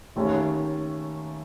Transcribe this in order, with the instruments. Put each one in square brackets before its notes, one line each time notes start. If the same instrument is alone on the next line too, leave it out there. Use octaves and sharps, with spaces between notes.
[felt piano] D#2 D#3 A3 C#4